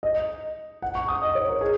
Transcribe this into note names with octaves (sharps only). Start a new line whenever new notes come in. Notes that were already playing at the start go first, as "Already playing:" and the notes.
D#5
F#5
C#6
D#6
D#5
C#5
A#4
G#4